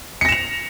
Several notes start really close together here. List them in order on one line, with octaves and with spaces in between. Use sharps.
C#7 A#6 E7 F7